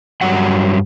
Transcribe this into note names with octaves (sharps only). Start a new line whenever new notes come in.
G2 F#3 F#5